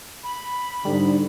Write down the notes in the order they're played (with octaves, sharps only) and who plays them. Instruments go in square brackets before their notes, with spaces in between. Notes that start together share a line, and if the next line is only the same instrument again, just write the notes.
[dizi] B5
[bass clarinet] G#2 [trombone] D3 [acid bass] G3